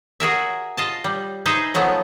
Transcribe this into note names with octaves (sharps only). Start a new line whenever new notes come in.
F#4 G#4 A#4 E5
F4 D#5 A5
G3
D#4 G#4 B4 C5 D#5 E5
C#3 F3 F#3 A3 B3